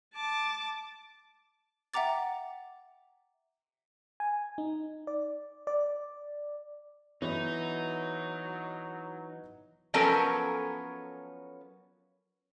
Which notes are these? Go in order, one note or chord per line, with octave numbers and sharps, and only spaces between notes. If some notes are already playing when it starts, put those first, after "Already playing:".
A5 D6
E5 F#5 G5 A#5 D6 A6
G#5
D#4
D5
D5
E3 F#3 B3 D#4 E4 F#4 C#5
F3 F#3 B3 C#4 A4 A#4